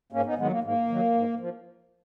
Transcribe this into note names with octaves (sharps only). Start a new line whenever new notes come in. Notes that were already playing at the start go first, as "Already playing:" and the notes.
G#2 A#3 C#4
B3 D#4
D#3 F#3 G#3 B3
A#3
G#2 A#3
D#3 F#3
G#2
F3